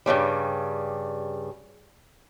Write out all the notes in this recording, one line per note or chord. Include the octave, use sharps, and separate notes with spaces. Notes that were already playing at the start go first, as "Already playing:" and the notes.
G2 A#2 C#3 G3